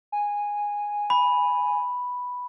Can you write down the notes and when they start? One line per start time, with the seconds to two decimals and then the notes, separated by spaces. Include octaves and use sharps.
0.12 G#5
1.10 B5